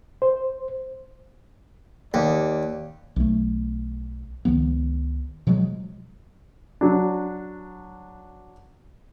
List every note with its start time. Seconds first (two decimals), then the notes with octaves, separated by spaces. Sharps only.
0.22 C5
2.14 D#2 D5
3.16 B1 A3
4.45 C#2 D#3 F3 B3
5.47 B2 F3 F#3 G#3
6.81 F#3 D4